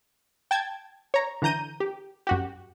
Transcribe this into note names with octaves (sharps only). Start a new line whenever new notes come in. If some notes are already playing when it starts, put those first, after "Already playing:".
G5 A5 G#6
C#5 A#5
D3 E3 A#5 G6 D#7
G4
F#2 F#4 G4